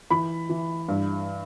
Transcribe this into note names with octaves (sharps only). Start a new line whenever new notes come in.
E3 B5
E3
G2